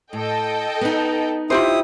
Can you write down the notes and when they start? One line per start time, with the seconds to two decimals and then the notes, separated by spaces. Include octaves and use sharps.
0.13 A2 A4 D#5 G5
0.81 B3 D#4
1.50 E4 F4 G4 C5 D#6